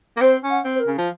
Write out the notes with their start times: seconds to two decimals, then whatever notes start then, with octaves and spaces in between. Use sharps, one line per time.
0.17 A#3
0.21 C4 C5
0.44 C#4
0.50 F#5
0.65 C4
0.75 C5
0.80 A#4
0.87 C#3
0.98 F3